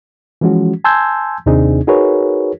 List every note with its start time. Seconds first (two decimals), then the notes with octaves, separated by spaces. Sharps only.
0.41 E3 F3 G#3 C#4 F#4
0.84 G#5 A5 C6 E6 G6 G#6
1.46 D#2 C3 C4 D4 D#4 G#4
1.87 D#4 F#4 G#4 A#4 B4 C#5